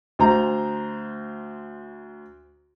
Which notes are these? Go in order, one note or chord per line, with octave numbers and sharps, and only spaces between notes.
D2 C5 A#5